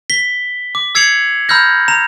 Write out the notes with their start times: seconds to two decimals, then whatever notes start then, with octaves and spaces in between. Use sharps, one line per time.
0.10 B6 G7
0.75 D6
0.95 E6 G#6 C7 C#7 F7 F#7
1.49 A#5 B5 E6 F6 G6 A#6
1.88 A#5 E7